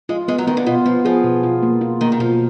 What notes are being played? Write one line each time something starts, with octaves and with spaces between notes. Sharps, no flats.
G#3 F4
G#3 B3
F#3
D#3 B3
D3
B2 F4
F3 B3
F3 G#4
B2
F4
A#3
F4
D#3 A#3
D#3
B2 F3